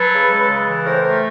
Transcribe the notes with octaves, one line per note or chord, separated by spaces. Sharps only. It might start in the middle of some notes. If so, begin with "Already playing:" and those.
Already playing: F#3 A4 B4
C#3
G#3
C#3
E3
A2 A#4 C5
A3 A#4 C5